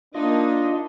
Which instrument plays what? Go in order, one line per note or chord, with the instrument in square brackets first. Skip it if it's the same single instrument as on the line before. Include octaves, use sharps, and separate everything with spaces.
[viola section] A#3 D#4 [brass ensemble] D4 [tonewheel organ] F4 D#5